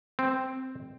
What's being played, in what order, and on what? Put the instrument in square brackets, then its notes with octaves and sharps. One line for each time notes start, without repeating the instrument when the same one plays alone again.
[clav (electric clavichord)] C4